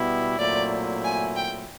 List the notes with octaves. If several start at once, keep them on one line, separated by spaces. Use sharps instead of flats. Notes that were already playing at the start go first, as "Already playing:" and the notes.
Already playing: B2 G3 B3 E4
A#2 F#3 A3 C4 E4 D5
G#5
G5